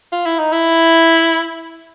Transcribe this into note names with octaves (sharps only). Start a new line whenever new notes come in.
F4
E4
D#4
E4